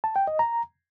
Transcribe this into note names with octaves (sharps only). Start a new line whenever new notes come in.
A5
G5
D#5
A#5